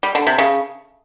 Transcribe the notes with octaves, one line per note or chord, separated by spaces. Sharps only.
G3
D3
C3
C#3